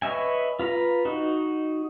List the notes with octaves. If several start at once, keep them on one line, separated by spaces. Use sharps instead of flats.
B4 C#5 D#5 E5 G#5
F4 B4 A#5
D#4 F#4